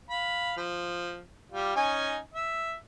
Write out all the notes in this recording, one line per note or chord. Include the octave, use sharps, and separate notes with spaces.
F5 B5
F3
G3 F4
C#4 D#4 G#5
E5